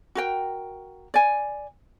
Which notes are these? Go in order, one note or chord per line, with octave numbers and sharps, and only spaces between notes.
F#4 A#4 G5
D5 G#5